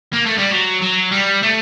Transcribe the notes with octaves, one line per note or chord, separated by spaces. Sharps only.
A#3
A3
G3
F#3
F#3
G3
A3